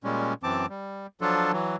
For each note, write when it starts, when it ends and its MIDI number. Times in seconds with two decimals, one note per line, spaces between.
0.04 0.33 46
0.04 0.33 55
0.04 0.33 56
0.04 0.33 61
0.43 0.66 42
0.43 0.66 52
0.43 0.66 60
0.43 0.66 81
0.43 0.66 86
0.70 1.07 55
1.21 1.52 53
1.21 1.52 54
1.21 1.52 62
1.21 1.52 65
1.21 1.52 69
1.53 1.76 52
1.53 1.76 54